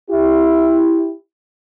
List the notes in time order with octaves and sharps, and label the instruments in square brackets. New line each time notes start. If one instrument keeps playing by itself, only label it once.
[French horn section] E4 G4